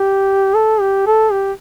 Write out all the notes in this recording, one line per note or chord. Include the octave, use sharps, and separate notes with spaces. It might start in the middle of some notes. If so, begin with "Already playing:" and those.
Already playing: G4
A4
G4
A4
G4